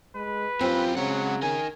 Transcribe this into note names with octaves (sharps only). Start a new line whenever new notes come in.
G#3 B4
F#2 C4 F4 G4
C#3 F#3 G#3 F#5
D#4 A#4 G#5